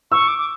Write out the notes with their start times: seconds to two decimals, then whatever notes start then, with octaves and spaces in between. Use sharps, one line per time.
0.12 C#6 E6
0.28 D6
0.39 D6